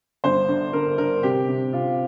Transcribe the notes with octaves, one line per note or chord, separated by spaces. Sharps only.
G1 C5
D3
D3 A#4
D3 A#4
C3 G4
C3
C3 F4